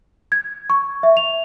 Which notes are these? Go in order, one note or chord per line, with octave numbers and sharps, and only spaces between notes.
G#6
C#6
E5
F7